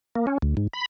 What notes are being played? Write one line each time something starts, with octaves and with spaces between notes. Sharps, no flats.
A#3
C#4
D2
G#2
B5